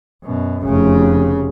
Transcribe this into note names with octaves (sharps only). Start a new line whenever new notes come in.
F#2 B2
F1 C#3